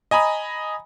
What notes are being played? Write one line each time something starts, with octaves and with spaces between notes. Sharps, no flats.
D#5 G#5 A#5 B5 D#6